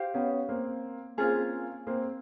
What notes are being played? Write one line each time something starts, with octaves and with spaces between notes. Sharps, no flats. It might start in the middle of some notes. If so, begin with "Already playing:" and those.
Already playing: G4 C5 F5
B3 C#4
A#3 C4
A#3 C4 C#4 F4 G#4
A#3 C4